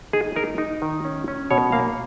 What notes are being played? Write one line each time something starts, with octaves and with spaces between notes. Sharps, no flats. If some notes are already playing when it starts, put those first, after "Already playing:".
D#4 G#4
D#4 A#4
D#4
D#3
C#4
C#4
B2 C#5
A#3 F5